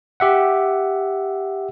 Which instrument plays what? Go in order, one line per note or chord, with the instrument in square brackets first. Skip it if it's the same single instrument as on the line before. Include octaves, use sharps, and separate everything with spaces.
[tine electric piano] G4 E5 F#5